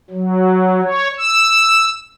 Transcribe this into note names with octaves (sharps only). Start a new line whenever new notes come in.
F#3
C#5
E6